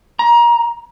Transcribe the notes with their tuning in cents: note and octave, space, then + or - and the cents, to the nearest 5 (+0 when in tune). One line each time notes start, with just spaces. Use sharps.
A#5 +25